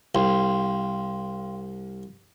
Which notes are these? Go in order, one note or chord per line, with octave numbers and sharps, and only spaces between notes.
C2 F5 G5 C6